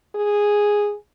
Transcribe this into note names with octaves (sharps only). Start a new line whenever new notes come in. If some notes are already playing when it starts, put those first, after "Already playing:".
G#4